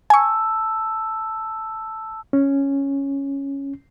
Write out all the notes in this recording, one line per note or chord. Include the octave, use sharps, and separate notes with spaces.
G#5 A5 C#6 E6
C#4